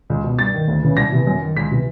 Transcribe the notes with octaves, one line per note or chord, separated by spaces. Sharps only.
C#2
B2
G2 A6
D#3
D2
C#3 E3
C2 A#6
C3 E3
F#2
D#3
C#2 B6
C3 E3